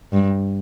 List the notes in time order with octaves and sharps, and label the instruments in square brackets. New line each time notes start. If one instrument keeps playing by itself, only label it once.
[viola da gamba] G2